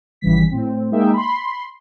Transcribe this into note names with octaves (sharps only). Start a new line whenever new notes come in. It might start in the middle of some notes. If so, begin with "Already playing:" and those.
G#1 C#3 E3 G3 B6
A2 C4
G#3 A#3 D#4 G#4 E5 G5
B5 C6